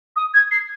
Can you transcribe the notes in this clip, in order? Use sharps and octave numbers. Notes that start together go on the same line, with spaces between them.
D#6
G#6
C7